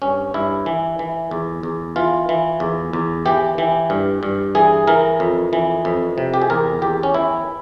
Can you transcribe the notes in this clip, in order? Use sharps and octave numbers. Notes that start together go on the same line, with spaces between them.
G2 C#4
G2 E4
E3
E3
E2
E2
E3 F4
E3
E2
E2
E3 G4
E3
G2
G2
E3 G#4
E3 A#4
F2
E3
F2
C3
G4
G#4
E2 A#4
E2 G4
C#4
E3 E4